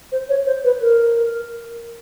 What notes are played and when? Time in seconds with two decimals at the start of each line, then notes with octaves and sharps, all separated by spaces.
0.12 C5
0.29 C#5
0.46 C5
0.65 B4
0.81 A#4